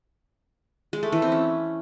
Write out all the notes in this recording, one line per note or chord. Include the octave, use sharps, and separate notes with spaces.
G#3
A3
E3
C4
C#4